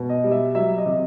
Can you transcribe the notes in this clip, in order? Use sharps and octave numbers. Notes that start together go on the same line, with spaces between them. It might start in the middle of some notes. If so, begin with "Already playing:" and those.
Already playing: B2
D#5
G3
E5
F#3 E5
D#5
C3